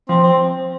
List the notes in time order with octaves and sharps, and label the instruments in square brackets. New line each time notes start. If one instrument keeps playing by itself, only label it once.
[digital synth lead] F3 [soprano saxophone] C4
[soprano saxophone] C4